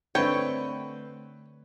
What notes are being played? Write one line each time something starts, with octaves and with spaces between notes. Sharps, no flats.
D3 A3 C4 B4 C#5 G5